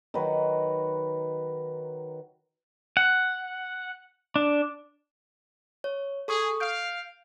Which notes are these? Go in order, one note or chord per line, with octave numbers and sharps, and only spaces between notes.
D#3 F#3 F#4 B4
F#5
D4
C#5
G#4 A4 C#6 D#6
F5 G6 D7